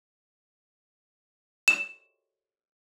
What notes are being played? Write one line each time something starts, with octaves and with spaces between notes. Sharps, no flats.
E7